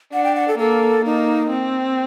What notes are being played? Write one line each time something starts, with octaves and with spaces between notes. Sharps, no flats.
D4 F#5
G5
F#5
A4
A#3 A4
A#3 D#4
C4